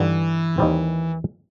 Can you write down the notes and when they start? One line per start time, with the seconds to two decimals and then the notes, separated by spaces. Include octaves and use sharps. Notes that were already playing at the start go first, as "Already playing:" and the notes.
Already playing: G2 D3 E3 G3 B3 D#4
0.58 D#2 D#3 G3 C4